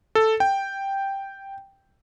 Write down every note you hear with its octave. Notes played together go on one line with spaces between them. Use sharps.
A4
G5